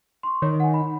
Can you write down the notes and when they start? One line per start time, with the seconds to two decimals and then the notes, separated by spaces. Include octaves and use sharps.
0.23 C6 C#6
0.42 D#3 C#5
0.60 F#5 G#5
0.74 B5